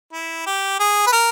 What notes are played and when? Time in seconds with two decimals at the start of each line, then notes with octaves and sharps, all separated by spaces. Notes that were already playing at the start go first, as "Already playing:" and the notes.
0.13 E4
0.46 G4
0.80 G#4
1.07 B4
1.12 A#4